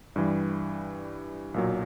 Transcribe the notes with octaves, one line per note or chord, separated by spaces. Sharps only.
G2 E3 G3
B1 A#2 F#3